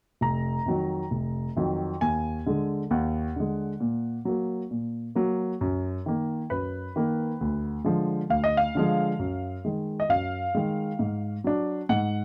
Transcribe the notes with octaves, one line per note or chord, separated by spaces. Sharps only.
F1 A#5
F2 D#3 F#3
F1
F2 D#3 F#3
D#2 G#5
D3 G#3
D#2 F#5
D3 G#3
A#2
F#3 A#3
A#2
F#3 A#3
F#2
D#3 A#3
F#2 B4
D#3 A#3
D2
D3 F3 G#3
D2 F5
D#5
F5
D3 F3 G#3
F#2
D#3 G#3
D#5
F#2 F5
D#3 G#3
G#2
F#3 D4
G#2 F#5